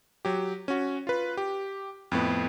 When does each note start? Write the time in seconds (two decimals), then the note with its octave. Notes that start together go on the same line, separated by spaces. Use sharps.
0.25 F#3 G4
0.68 C#4 F#4
1.07 F4 B4
1.37 G4
2.12 F2 A2 B3